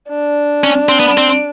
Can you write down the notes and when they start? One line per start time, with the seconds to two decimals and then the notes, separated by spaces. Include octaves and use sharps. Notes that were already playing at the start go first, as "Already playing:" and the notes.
0.09 D4
0.64 C#4
0.89 C4
1.00 B3
1.18 C4